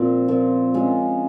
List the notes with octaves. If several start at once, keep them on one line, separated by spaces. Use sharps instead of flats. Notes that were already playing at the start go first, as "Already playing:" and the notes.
Already playing: A#2 F3 C4
A#2 F3 C4
G#3 C#4 F4